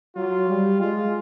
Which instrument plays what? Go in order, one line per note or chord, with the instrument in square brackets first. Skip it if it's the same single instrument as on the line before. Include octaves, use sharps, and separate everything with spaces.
[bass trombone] F#3 [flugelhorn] F4
[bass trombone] G3
[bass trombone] G#3 [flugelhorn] F4